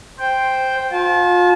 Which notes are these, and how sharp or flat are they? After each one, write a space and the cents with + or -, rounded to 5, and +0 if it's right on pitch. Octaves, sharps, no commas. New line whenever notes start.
C5 +0 G5 +0
F4 +30 A5 -30